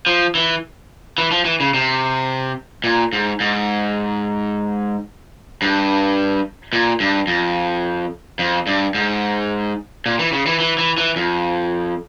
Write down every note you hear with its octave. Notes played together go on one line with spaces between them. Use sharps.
F3
E3
E3
F3
E3
C#3
C3
A#2
G#2
G#2
G2
A#2
G2
F2
F2
G2
G#2
A#2
E3
C#3
E3
E3
E3
E3
F2